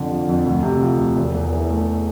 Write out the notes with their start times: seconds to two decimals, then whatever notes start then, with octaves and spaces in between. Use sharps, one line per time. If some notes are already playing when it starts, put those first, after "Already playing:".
Already playing: F2 D3
0.11 F3
0.28 F2
0.46 D2
0.63 C3
0.81 F3
0.98 D2
1.16 E1
1.34 E2
1.52 E3
1.70 A3